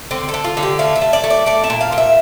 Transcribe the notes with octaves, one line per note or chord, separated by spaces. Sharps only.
D3 C4
A4
D3
F4
D3
G4
A3 F5
E5
A3
D5
A3
D5
A3 D5
E5
A#2
F5
A#2
E5